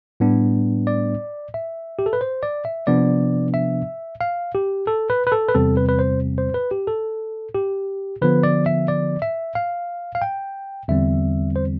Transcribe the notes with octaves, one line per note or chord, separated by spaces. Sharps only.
A2 G3 B3 D4
D5
E5
G4
A4
B4
C5
D5
E5
C3 F3 B3 D4 D5
E5
F5
G4
A4
B4
B4
A4
B4
E2 C3 G3 C4 A4
B4
B4
C5
C5
B4
G4
A4
G4
D3 F3 B3 B4
D5
E5
D5
E5
F5
F5
G5
E2 D3 G3 C4 E5
C5